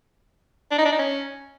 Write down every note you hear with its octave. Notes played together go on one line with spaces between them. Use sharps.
D4
D#4
D4
D#4
C#4